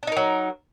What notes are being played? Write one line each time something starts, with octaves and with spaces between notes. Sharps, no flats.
F#3 D4 D#4 A#4